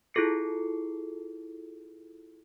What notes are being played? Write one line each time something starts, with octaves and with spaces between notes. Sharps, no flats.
E4 F4 G#4 A4 C7 C#7